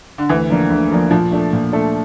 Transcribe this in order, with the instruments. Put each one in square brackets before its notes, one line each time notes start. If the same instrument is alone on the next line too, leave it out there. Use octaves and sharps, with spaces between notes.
[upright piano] D3
[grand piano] D2 [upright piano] E3
[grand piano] D3 F3 A#3 D4
D2
D3 F3 A#3 D4
[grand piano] A#2 [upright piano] F3
[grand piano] A3 D4 A4
A#2
A3 D4 A4